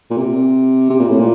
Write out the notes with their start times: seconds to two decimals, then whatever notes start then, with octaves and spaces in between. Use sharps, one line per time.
0.10 A#2
0.17 C3
0.90 C3
1.00 A#2
1.09 A2
1.19 A#2